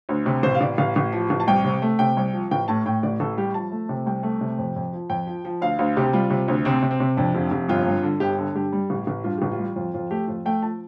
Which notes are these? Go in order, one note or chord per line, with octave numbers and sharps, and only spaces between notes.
D2
C3
A1 C5
F5
A1 D5
A1 F5
A1
F3
A1
A5
C2 G5
C3
A3
C3 G5
C2
F3
A1 G5
A2 A5
A2 G5
A1 D5
A1 A4
G3 G4
F3 A5
A3
C3
C2 G5
A3
C3
F2
F2
F3
F2 G5
F3
F3
D2 F5
D2 F5
C3 G4
G3 F4
C3
D2
C3 C4
C3
C4
C3
F2 D4
F1
F1
G1 F4
G2
D3
G1 G4
D3
G2 G4
G3
A1
A1
G2 F4
A1 G4
F4
G3
F2 F4
F2 F4
A3 G4
F2 F4
A3 G5
F3 A5